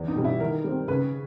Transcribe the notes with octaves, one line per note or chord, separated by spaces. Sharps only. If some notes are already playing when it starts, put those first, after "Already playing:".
Already playing: E2
D#4
B2 G3
E4
D#3 A#4
G3 C4
C#3 B4